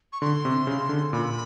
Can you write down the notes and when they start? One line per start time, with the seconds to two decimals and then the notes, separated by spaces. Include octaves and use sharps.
0.13 C#6
0.21 D3 C6
0.45 C3
0.67 C#3
0.89 D3
1.13 A#2 B5